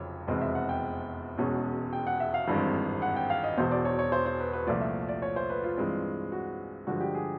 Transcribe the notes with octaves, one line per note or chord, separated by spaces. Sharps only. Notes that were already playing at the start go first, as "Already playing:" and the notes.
Already playing: F1 F2 C#3 F#3 C5 C#5
F1 E2 B2 G#3 C4 D#5
E5
F#5
G5
E1 E2 B2 G#3 C#4
G5
F#5
E5
F5
G#1 G2 E3 G#3 C4
F#5
G5
F5
D#5
E1 E2 B2 C5
D5
C#5
C#5
C5
C5
B4
B4
C2 A#2 F3 A3 D5
E5
D5
C#5
C5
B4
F4
G2 E3 G#3 C4
F#4
G2 D3 F3 G#3 F#4
G4
G#4